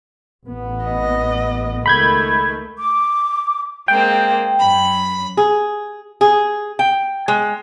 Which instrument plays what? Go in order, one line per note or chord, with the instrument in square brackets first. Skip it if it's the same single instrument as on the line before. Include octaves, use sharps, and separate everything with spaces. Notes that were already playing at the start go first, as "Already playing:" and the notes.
[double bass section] A1 B3
[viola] D#5
[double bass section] C#2 [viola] D#3 A3 [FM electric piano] B5 G6 G#6
[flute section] D6
[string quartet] G#3 A#3 C4 [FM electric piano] G5
[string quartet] F#2 B5
[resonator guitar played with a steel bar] G#4
G#4
G5
G#3